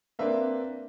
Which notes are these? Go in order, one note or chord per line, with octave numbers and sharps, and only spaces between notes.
A#3 C4 D4 B4 E5 F5